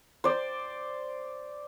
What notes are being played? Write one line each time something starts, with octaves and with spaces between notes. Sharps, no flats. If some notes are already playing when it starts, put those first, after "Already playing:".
C5 D5